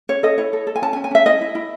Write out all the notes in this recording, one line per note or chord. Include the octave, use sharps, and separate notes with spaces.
C#4 C#5
A4 D#5
E4 C#5
A4
A4
G#5
C#4 A5
G#5
C#4
G#5
C#4 E5
E4 D#5
E4
E4